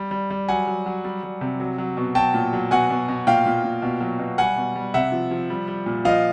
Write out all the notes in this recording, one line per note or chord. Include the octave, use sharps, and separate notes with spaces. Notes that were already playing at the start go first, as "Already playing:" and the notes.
Already playing: G3
G3
G3
F#3 F#5 G#5
F#3
F#3
G3
G3
C3
F#3
F#3
B2
F#3 G5 A5
A#2
F#3
B2 F#5 G#5
B2
B2
A#2 F5 G5
A#2
A#2
B2
F#3
B2
G3 F#5 G#5
B2
G3
C3 E5 F#5
F3
F3
G3
G3
A#2
F3 D#5 F5